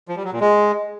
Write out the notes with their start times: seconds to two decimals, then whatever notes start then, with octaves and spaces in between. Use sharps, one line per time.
0.08 F3
0.16 G3
0.24 F#3
0.32 A#2
0.40 G#3